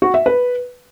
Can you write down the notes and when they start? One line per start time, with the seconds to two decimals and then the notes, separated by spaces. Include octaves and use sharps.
0.02 F#4
0.14 E5
0.26 B4